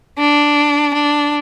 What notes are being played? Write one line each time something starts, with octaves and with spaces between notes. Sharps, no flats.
D4
D4